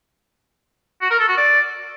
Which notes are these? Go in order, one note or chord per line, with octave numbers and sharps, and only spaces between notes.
F#4
A#4
A4
F#4
D5